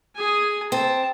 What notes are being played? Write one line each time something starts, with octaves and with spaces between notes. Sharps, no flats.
G#4 G#5
C4 A5